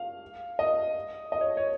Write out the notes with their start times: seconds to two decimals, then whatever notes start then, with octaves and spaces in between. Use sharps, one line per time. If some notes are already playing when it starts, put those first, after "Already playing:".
Already playing: F5
0.59 D#5
1.32 D#5
1.41 C#5
1.57 C#5